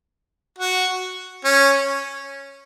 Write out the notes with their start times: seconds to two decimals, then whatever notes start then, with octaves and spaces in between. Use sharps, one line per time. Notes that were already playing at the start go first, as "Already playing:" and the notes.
0.58 F#4
1.45 C#4